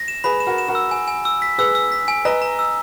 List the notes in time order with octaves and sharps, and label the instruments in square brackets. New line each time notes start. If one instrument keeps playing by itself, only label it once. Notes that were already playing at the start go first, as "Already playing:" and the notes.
Already playing: [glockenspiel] A#6
E7
[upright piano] G#4 B4 [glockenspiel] B5
[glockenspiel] E7
[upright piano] F#4 A#4
[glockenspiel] E7
[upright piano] F#4 A#4
[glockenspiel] E6
G#5
G#5
E6
B6
[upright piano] G#4 B4 [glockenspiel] E6
[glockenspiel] E6
B6
G#5
[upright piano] B4 D#5 [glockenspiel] A#5
[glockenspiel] A#5
E6